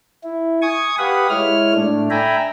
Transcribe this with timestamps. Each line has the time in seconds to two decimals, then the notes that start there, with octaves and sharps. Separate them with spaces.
0.23 E4
0.62 G#5 C#6 D#6 G#6
0.98 G4 B4 F5 F#5 B5 D#6
1.30 G#3 E4 C#5 F6
1.75 A2 A3 D4
2.10 E5 G5 G#5 A#5 B5